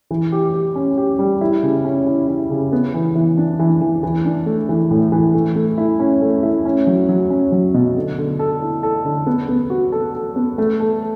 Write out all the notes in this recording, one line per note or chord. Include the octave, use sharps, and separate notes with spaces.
E3
G4
G4
C#4
G4
G3
E4
C#3
C#4
E4
E4
C#3
B3
E3
E3
D4
E3
E3
E3
D4
A3
E3
A2
E3
A3
A3
E4
C#4
A3
E4
C#4
F#3
F#3
C#4
F#3
B2
D3
D3
A4
E4
A4
D3
B3
B3
F#4
A4
A4
B3
A3
A4